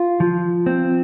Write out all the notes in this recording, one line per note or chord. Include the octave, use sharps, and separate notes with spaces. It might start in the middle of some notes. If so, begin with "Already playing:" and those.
Already playing: F4
F3
C4